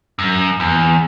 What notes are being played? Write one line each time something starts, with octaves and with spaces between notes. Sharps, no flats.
F#2
E2